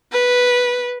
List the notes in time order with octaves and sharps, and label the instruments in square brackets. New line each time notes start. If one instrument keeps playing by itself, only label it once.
[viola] B4